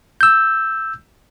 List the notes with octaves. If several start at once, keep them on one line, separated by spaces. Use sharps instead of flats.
E6 G6